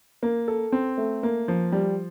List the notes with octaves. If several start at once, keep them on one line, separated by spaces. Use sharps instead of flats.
A#3
A4
C4
A3
A#3
F3
G3